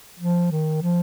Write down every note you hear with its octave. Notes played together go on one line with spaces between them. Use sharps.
F3
D#3
F3